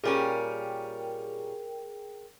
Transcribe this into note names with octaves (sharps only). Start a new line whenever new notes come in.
A#2 G3 C#4 G#4 A#4 G5